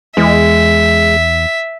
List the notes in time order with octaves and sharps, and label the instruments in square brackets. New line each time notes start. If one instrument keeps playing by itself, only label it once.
[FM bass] E2 [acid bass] G#3 [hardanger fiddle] E5